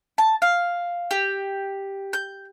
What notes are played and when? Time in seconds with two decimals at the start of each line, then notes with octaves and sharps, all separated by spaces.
0.18 A5
0.42 F5
1.11 G4
2.13 G6